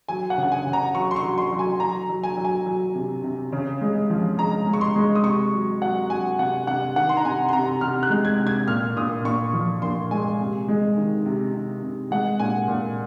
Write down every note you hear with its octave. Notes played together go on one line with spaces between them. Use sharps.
F#3 G#5
F#5
C#3
F#5
G#5
C#3
A#5
F#3 C#6
C6
C#6
F#3
C6
F#3
G#5
F#3 A#5
F#3
G#5
F#3
G#5
F#3
C3
C3
C#3
G#3
F3
G#3 A#5
G#3
C#6
C6
G#3
D#6
C3 C#6
F#3
F#3 F#5
F#3 G#5
C3 F#5
C3 F#5
D#3 F#5
C6
A#5
C3 G#5
C6
C3 A#5
C3 F6
F#6
G#3
G#6
C3
G#6
A#2 F6
A#2 D#6
A#2 C#6
F3
A#2 C6
G#3 G#5
C3
G#3
D#3
C3
C3
C3
G#3 F#5
A#2 G#5
A#2